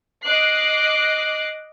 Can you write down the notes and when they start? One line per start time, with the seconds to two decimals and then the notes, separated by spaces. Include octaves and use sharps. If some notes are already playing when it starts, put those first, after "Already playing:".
0.23 D#5 D6 F#6 C7